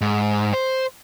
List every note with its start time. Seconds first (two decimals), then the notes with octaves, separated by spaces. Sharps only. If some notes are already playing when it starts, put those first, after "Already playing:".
0.01 G#2
0.54 C5